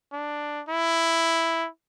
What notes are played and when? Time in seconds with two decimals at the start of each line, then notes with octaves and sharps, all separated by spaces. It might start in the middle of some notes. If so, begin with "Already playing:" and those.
0.13 D4
0.69 E4